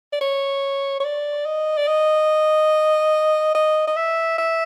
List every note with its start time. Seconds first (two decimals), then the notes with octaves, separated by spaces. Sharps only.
0.13 D5
0.21 C#5
1.00 C#5
1.05 D5
1.45 D#5
1.77 D5
1.87 D#5
3.55 D#5
3.87 D#5
3.96 E5
4.38 E5